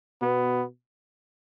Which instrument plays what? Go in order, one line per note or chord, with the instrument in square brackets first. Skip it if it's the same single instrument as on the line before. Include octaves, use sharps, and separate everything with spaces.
[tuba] B2 [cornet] B3